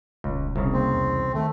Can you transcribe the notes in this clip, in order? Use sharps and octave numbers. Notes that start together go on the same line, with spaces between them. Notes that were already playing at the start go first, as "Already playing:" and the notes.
D#1 C#2
C2 C#3
A#3 C4
E2
D#3 A3